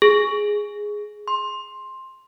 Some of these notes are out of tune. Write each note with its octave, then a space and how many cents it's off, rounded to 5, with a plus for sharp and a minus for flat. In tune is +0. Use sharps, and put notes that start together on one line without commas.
G#4 -5
C6 +10